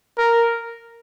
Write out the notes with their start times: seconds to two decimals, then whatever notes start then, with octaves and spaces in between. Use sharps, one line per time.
0.18 A#4